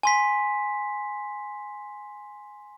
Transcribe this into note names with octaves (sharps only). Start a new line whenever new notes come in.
G#5 C6 B6